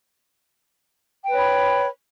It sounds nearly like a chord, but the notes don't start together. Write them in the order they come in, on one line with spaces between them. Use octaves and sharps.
G5 B4 C#5 B5